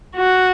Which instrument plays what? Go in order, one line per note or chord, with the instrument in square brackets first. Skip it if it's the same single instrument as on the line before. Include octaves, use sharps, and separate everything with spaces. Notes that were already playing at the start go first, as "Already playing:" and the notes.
[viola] F#4